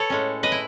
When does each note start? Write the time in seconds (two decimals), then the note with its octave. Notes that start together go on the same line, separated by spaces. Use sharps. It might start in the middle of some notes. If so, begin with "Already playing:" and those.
Already playing: A4 B4 C#5
0.10 A2 G#3 C#4
0.43 B4 D#5
0.52 E4